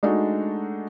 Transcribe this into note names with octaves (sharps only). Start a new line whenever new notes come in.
G#3 A3 D4 D#4 F#4 A4